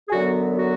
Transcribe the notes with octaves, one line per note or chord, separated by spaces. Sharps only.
G#4
F#2 D3 F#3 B3 F#4
F#4